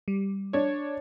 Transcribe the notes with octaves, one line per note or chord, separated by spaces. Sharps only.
G3
D4 C#5